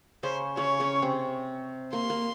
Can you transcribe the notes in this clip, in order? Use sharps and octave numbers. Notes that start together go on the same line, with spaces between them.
C#3 C#4 C5
C#3 C#4 C#5
C#3 C#4
C3 C4
A#3 C6
A#3